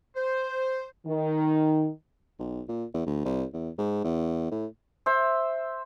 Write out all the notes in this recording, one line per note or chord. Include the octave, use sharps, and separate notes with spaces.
C5
D#3
B1
A#2
E2
D2
C2
E2
G#2
E2
A2
C5 E5 E6